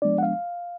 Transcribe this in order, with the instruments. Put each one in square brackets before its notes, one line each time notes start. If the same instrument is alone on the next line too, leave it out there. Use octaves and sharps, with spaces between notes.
[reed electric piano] F3 G#3 B3 D4 D5
F#5
F5